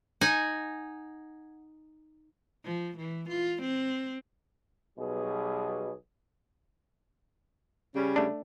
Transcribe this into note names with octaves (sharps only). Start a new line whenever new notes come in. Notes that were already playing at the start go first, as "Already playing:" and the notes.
D#4 F#5 G#5
F3
E3
F4
C4
B1 B2 G3 G#4
C#3 G3 C#4
A3 D4